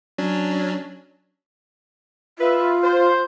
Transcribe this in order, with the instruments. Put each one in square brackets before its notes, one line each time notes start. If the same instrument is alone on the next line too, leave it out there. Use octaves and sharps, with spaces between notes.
[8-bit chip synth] F#3 C#4 D4
[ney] F4 [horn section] B4 E5
[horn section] C5